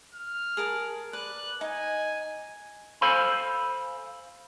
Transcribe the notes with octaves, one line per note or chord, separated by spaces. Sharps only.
F6
G#4 A#4 A5
B4 D5 F#6
D#4 G#5
A4 C5 F5 G#5 B5